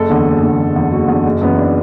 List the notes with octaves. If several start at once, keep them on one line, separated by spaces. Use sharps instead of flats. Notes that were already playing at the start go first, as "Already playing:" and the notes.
Already playing: F#1 A4
E2 D3
F#1
E2 D3
F#1
E2 D3
F#1 F#4
E2 D3
F#1
F#2 E3 B3
D4